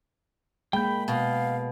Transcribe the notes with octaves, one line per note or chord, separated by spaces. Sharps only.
G#3 A#3 G5 B5 G6
B2 F5